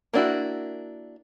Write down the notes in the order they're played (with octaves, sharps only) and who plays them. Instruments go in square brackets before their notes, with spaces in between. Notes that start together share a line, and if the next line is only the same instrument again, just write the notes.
[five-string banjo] A#3 B3 D4 E4 F#4